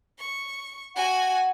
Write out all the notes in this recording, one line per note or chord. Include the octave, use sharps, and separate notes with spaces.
C#6
F#4 F#5 G#5